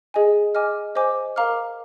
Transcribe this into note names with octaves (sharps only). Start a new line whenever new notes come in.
G#4 D#5 G#5
D#5 G#5 D6 F6
C5 D#5 G#5 D6
A#4 F5 A#5 D6 F6